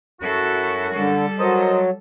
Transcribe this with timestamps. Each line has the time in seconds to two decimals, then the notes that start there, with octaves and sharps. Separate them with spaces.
0.21 F#2 E4 F#4 A4
0.94 D3 G3 A4
1.39 F#3 A#4 C5 D#5